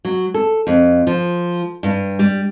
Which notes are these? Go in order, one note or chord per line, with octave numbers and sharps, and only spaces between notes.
F#3
A4
F2
F3
G2
G3